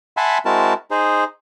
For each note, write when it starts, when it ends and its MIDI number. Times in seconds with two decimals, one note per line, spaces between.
0.17 0.38 76
0.17 0.38 78
0.17 0.38 80
0.17 0.38 81
0.17 0.38 83
0.17 0.38 84
0.45 0.74 56
0.45 0.74 60
0.45 0.74 64
0.45 0.74 66
0.45 0.74 70
0.45 0.74 81
0.91 1.24 63
0.91 1.24 68
0.91 1.24 72